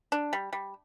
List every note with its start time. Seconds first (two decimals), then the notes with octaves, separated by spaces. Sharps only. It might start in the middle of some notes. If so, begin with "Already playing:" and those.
0.12 D4
0.33 G3
0.53 G3